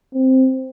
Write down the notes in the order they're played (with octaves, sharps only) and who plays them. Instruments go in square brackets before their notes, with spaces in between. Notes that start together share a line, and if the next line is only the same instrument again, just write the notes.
[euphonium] C4